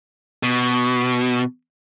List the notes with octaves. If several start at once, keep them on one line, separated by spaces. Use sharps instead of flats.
B2